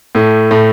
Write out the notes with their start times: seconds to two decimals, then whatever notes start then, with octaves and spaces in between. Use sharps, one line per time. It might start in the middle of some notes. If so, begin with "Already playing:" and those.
0.15 A2 A3
0.51 A2 A3